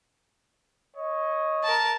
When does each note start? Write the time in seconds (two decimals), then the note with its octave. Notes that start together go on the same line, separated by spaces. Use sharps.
0.95 C#5 D#5
1.64 A#4 A5